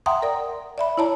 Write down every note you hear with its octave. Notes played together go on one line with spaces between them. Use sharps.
E5 F#5 G5 A#5 C6 D#6
A#4 D5
D5 E5 B5
E4 C#5 D5 A5 A#5